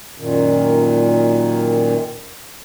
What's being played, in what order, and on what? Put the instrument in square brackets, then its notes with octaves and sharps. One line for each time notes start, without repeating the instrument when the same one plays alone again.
[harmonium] F#2 A#2 D#3